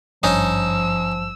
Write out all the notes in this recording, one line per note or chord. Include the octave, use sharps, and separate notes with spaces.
G#1 G2 F3 C#4 D#4 D#5 E6